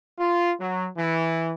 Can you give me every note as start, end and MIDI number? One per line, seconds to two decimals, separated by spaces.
0.18 0.52 65
0.59 0.87 54
0.97 1.54 52